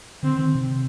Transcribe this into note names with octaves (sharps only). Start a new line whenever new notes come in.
D3 C4
D#3
C3